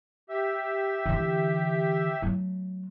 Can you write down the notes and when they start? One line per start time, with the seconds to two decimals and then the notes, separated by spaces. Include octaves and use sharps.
0.29 G4 E5 E6
1.06 D3 E3
2.22 F#3 A3